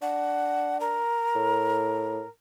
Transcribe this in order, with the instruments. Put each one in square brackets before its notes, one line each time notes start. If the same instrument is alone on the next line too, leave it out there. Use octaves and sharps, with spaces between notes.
[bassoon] D4 [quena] F#5
[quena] A#4
[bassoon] A2